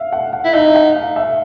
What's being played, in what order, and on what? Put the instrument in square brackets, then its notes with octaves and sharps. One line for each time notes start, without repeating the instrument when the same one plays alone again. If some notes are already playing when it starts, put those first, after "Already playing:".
Already playing: [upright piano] E5 F5
F#5
F#5
[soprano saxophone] E4
[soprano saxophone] D#4 [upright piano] E5
[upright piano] F#5
F5
E5